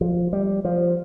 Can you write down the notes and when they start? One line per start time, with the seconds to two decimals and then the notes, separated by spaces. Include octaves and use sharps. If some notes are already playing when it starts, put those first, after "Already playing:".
0.01 F3
0.33 G3
0.65 F3